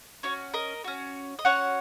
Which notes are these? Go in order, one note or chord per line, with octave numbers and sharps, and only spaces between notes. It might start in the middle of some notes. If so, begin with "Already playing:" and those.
C#4 F#4 C#5
A#4 D#5
C#4 F#4
D#5
C#4 F#4 C#5 F#5